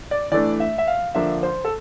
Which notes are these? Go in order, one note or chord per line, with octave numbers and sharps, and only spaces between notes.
D5
E3 A3 D4 D5
E5
E5
F5
D3 F3 A#3 D4 E5
C5
A4